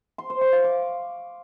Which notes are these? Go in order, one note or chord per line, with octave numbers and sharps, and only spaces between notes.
C6
C5
C#6
F5
D6